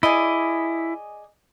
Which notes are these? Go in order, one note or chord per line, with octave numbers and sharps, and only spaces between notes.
E4 G#4 D5 D#5